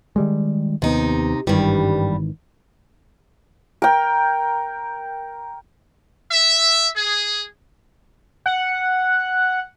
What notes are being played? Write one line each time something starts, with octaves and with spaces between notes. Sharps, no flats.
D#3 G3 G#3
D#2 C3 B3 D#4
G#1 G2 D#3 E3 G3
A#4 G5
E5
G#4
F#5